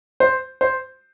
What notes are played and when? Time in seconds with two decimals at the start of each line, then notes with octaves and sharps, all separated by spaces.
0.20 C5
0.61 C5